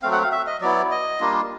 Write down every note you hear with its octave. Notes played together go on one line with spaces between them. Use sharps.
F#3 A3 C4 F5
F#5
F5
E5
D#5
F#3 B3 E4 D5
D#5
G3 A#3 D4 F4